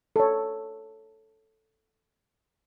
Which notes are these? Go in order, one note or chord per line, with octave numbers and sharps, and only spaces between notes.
A4 C#5